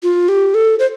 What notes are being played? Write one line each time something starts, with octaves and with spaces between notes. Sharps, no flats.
F4
G4
A4
C5